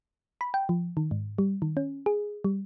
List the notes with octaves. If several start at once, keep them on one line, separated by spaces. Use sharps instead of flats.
B5
G5
F3
D#3
G#2
G3
D#3
C#4
G#4
G3